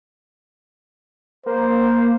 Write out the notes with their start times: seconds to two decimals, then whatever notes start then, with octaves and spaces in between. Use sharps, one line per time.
1.46 A#3 C5